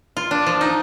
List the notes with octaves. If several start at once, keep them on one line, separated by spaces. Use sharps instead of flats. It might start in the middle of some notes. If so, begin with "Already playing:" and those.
F4
D4
F3
D#4